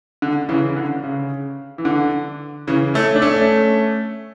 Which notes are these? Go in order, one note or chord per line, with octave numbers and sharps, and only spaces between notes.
D3
C#3 E3
D3
C#3
E3
D3
C#3 E3
A3 C#4
D4
A3 C#4